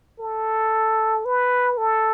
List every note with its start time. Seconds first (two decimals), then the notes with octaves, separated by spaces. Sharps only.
0.20 A4
1.25 B4
1.77 A4